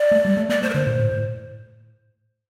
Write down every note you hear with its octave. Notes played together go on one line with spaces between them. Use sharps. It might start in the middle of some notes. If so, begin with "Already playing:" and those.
Already playing: D5
A3
G3
A3
A#3 D5
A3 C5
A#4
D3 C5
A#2
A2
A2